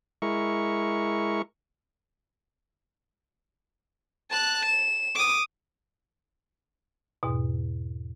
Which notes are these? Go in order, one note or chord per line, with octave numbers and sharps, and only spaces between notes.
G#3 E4 A#4 C#6
A5 F#6
E7
D6 D#6
E2 G#2 B2